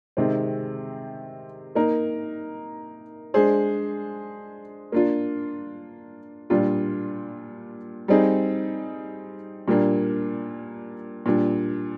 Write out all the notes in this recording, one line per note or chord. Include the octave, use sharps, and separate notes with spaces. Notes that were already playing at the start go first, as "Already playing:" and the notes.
C3 D#3 G#3 C4
A#3 D#4 A#4
G#3 D4 G#4 C5
A#3 D4 F4
A#2 G3 D4 F4
G3 C4 D#4 G#4
A#2 G3 A#3 D4
A#2 G3 D4